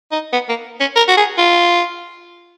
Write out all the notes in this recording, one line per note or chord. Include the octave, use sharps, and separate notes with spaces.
D#4
B3
A#3
C#4
A#4
F#4
G#4
F4